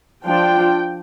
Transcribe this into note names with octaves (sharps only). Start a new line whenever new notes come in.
F3 D4 F4 G5